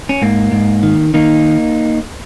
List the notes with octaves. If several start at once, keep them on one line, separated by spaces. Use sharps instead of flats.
C#4
G#2 A#3
G#2
D#3
D#3 A#3 D#4